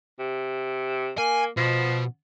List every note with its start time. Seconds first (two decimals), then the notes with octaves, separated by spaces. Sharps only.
0.19 C3
1.18 A#3 G#5
1.57 B2 F3